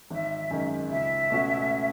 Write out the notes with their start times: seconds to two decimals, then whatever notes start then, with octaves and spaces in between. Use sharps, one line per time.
0.10 G#1 E5
0.51 F#2 D#3 G#3
0.90 C#2 E5
1.30 B2 A3 C#4 F#4